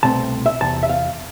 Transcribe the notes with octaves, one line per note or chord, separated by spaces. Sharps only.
C2 B2 A3 C4 A5
E5
E2 C3 A5
E5
F5